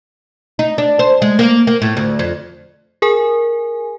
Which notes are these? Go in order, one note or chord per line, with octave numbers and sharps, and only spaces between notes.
D#4
D4
C5
G#3
A#3
A#3
A2
D2
F2
G#4 A#4 G#5